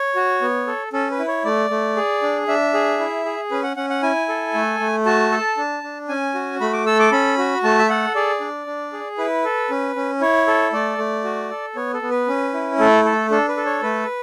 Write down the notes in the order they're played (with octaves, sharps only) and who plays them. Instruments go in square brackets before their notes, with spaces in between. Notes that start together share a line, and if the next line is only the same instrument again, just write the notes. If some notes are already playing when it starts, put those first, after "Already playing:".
Already playing: [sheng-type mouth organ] C#5
F#4
B3
A4
C#4 A4
B4
E4
C#5
A3 D5
A3
G#4
D4
D4 E5
G#4
E4
G#4
C#4 B4
F#5
C#4 F#5
F#5
E4 G#5
A4
A3
A3
F#4 A5
A4
D4
D4
C#4 G#5
F#4
A3 B5
D6
A4 E6
D6
C#4 B5
F#4
A3 A5
E5
A4 F#5
G#4 D5
D4
D4
G#4
E4 B4
A4
C#4
C#4
E4 C#5
A4
A3 D5
A3
F#4
A4
B3 C#5
A4
B3
B4
C#4
E4
A3 A4
A4
D4 A4
B4
A4
C#5
A3 B4